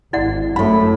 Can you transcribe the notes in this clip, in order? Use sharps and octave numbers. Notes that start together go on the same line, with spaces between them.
G#1 E4 D5 F#5
F#2 A2 A3 B5